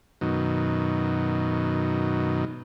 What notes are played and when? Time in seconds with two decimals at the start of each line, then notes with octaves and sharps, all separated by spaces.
0.21 F#2 B2 D#3